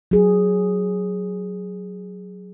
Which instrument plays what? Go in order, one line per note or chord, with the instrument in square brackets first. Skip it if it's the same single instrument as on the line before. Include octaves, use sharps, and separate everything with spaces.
[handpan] F#3 G#4